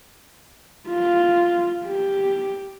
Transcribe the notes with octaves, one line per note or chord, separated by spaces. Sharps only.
F4
G4